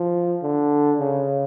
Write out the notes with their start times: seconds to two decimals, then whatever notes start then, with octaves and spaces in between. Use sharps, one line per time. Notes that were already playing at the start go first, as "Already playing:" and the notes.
Already playing: F3
0.42 D3
0.99 C#3